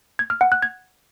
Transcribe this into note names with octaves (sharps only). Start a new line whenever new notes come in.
G#6
F6
F#5
F#6
G#6